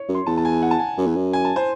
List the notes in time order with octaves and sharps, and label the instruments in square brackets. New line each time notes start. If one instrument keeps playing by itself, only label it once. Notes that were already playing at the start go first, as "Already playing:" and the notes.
Already playing: [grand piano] C#5
[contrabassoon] F#2
[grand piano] C6
[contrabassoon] E2 [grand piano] A5
[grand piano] A5
G#5
F#5
A5
G#5
[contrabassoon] F#2
E2
F#2
[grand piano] G#5
A5
C5